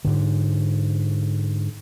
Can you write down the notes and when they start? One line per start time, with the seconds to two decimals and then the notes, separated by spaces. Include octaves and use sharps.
0.05 G#2 D3